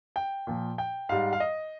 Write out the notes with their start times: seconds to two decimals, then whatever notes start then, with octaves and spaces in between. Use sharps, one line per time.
0.16 G5
0.47 A#2 F3
0.78 G5
1.09 G#2 G3 F5
1.33 F5
1.40 D#5